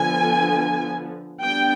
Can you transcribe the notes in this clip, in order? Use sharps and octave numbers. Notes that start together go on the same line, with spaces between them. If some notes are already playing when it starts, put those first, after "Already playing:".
Already playing: D3 F3 B3 G#5
G3 B3 D4 G5